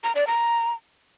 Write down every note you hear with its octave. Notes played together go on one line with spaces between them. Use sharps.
A#5
D5
A#5